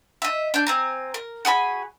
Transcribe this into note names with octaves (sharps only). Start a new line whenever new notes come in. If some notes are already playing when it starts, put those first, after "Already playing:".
D#5 E5
D4 G6
C4 G#5 A#5
A#4
F#4 G#4 G#5 B5